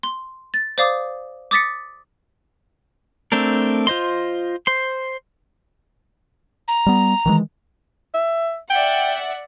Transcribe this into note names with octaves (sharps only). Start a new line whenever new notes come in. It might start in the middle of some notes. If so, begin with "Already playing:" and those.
C6
A6
C5 D5 F5 D6 D#6
D6 D#6 A6 B6 C#7
A3 C4 D4 A#4
F4 C5 D#5 C6
C5 C6
A#5
G3 B3
D#3 E3 G#3
E5
D5 E5 F#5 G5